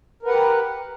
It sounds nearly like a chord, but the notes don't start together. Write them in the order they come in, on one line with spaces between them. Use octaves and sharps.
A#4 B4 F#5 G4